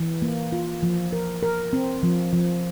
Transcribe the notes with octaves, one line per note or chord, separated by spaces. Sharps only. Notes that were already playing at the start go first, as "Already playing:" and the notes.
Already playing: E3
A#3
F4
F3
A#4
A#4
C4
F3
F3